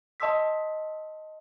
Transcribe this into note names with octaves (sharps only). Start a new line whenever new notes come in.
D#5 A5 C6 D#6 E6 B6